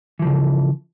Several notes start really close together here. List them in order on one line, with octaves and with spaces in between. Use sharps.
E3 F3 C#3